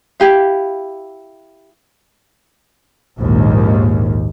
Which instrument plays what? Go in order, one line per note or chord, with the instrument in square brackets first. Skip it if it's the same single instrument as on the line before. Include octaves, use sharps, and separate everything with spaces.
[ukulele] E4 G4 F5
[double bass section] A#1 D#2 G#2